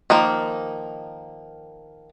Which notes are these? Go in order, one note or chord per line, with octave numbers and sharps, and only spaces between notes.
D#3 F3 A#3